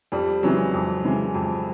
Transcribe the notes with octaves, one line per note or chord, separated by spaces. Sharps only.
F2 G3
C#3 E3 F#3 G#3
F2
C#3 E3 G#3
F2